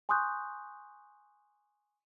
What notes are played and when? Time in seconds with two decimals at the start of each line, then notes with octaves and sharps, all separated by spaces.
0.09 G#5 C6 C#6 D#6 F#6 G6